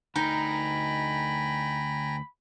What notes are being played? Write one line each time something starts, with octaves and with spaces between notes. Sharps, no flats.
D2 D#4 A#4 G5 G#5 A#5 B5